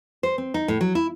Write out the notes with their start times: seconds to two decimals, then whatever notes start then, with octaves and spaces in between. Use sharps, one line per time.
0.23 C5
0.38 C4
0.54 D#4
0.68 A2
0.81 F#3
0.95 E4